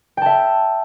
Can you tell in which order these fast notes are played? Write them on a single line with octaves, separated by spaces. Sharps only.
G5 A5 E5